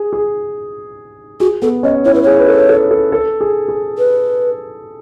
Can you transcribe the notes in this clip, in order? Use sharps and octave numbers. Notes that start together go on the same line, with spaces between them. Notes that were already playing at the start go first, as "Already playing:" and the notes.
Already playing: G#4
G#4
F#4 G#4
B3 A4
C#4 D#5
E4 C#5
B4
G#4 C#5
B4
A4
A4
A4
A4
G#4
G#4
B4